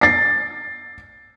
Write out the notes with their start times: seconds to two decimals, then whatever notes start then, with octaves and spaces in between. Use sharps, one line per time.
0.01 A6 C7